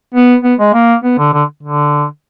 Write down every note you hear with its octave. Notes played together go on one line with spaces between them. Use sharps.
B3
B3
G#3
A#3
B3
D3
D3
D3